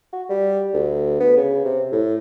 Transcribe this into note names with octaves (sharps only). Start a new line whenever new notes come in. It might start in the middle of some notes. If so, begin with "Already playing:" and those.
F#4
G3
D2
B3
C#3
C3
A2